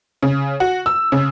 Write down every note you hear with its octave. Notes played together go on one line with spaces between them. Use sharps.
C#3
F#4
E6
C#3